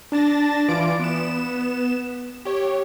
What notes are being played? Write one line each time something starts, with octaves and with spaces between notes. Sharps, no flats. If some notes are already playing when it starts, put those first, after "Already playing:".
D4 A5 A6 A#6
E3 F4 D5 D6 D7
B3 E7
G4 C#5